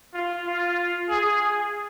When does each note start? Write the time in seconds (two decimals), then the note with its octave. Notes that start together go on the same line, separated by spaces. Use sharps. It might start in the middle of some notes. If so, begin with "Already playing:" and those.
0.15 F4
0.47 F4
1.10 G#4